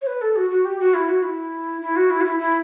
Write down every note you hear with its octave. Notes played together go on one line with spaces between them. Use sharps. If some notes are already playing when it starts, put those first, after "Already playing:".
C#5
B4
A4
F#4
F#4
G4
F#4
E4
F#4
E4
E4
F#4
E4
F#4
E4
E4